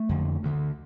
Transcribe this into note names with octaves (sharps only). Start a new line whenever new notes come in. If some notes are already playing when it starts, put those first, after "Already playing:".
Already playing: A3
F2 D3
D2 D3